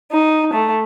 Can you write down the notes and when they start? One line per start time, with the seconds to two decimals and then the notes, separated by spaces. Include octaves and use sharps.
0.12 D#4
0.53 A3